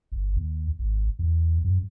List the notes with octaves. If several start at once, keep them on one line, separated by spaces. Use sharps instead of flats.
G1
D#2
G#1
E2
F#2